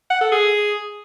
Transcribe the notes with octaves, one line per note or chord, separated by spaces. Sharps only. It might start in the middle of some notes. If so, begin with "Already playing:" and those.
F#5
A4
G#4